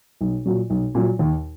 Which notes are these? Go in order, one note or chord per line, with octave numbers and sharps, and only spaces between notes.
B1
A#2 F#3
B1
A#2 F#3
D#2